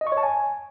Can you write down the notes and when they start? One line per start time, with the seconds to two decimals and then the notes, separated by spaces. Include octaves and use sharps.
0.01 D#5
0.07 C#6
0.12 C#5
0.18 A5
0.23 G#5